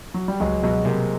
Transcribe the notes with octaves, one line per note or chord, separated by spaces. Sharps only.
F#3
G3
C#2 F#3 G#3
B2 F#3 G#3
C3 G#3 A#3